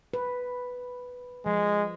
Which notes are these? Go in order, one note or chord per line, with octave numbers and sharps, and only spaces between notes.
B4
F3 G#3